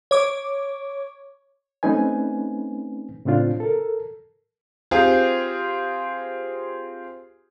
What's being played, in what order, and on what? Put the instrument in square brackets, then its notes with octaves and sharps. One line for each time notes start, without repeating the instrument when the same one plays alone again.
[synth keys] C#5 D6
[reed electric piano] A3 C4 C#4 D#4 B4 G#5
A2 C#3 C4 D4 F4
A4 A#4
[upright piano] C4 F4 G4 G#4